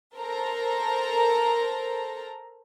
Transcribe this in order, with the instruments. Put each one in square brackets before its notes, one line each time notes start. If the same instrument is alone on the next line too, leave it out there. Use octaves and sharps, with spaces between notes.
[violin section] A4 A#4 C5 A#5